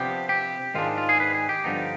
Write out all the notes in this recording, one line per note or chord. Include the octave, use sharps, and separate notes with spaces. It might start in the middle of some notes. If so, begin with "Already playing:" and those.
Already playing: C3 F3 B3 D4 G4
G4
G#2 D#3 G#3 D4 F4
F4
G#4
B4
G#4
G4
G2 D3 F3 B3 D#4